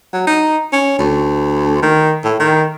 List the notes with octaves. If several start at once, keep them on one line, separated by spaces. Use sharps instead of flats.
F#3
D#4
C#4
D2
D#3
A2
D#3